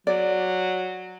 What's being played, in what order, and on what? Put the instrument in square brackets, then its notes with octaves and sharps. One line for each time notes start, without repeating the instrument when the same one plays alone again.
[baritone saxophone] F#3 [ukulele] D5